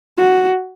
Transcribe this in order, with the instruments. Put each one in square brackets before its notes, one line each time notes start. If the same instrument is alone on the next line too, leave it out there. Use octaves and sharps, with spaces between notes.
[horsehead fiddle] F#4